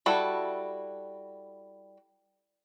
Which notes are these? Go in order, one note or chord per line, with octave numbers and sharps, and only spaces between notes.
G3 E4 F#4 A4